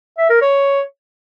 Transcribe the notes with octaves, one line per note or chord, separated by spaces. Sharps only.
E5
A#4
C#5